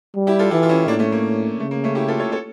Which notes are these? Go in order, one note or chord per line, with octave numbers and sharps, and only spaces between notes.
G3
E4 G4
F4 A4
E3 E4 G4
F4
C#4 E4
A2 A#3 D4
A3 C#4
A#3
C#3 A3
A#3
A3 C#4
E4 G4
F4 A4
A4 C#5
A4 C#5